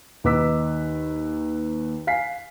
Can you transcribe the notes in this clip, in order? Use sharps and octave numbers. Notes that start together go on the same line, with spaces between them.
D#2 D#4 B4 D6 E6 B6
F5 G#5 B6 C7